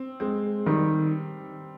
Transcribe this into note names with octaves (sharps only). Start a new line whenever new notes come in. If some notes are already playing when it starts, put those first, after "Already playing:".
Already playing: C4
G#3 C4
D#3 G3